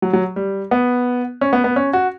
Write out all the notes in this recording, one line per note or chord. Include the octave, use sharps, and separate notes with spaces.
F#3
F#3
G3
B3
C#4
B3
B3
C#4
F#4